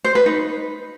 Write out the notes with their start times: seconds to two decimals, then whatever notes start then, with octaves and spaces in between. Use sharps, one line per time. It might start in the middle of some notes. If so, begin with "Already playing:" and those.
0.04 C5
0.15 B4
0.26 D#4